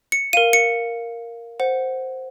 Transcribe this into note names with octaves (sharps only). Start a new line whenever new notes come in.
C#7
A#4 F5 D#7
C#7
C5 F#5